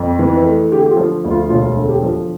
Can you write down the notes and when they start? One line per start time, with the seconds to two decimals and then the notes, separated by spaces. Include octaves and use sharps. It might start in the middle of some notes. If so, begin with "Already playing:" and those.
Already playing: F2
0.19 E3
0.33 B4
0.45 A3
0.71 D3 G4
0.86 G4
0.91 F4
0.97 F3
1.24 D2
1.30 F4
1.49 E1 F4
1.76 D3
1.88 G4
2.02 F3